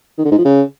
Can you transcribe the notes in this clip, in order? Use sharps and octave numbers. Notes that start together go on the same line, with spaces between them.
D#3
D3
G#2
F3
C#3